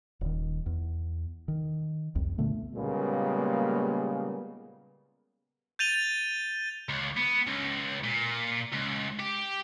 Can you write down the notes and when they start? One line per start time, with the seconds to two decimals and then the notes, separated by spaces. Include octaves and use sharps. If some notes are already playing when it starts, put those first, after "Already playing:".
0.21 D#1 D#3
0.66 E2
1.48 D#3
2.15 C2 F2
2.38 A#2 D3 A3 B3
2.75 A#2 C#3 G3 G#3 A#3 B3
5.79 G6 A6 D#7 F7 G7
6.89 C#2
7.17 B3
7.47 C#2
8.04 A#2
8.73 C#2
9.20 G4